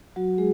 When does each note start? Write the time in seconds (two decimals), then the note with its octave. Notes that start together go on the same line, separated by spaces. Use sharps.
0.16 F#3 F#4
0.38 G#3 G#4